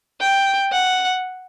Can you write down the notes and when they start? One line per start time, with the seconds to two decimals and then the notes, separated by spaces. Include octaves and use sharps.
0.21 G5
0.72 F#5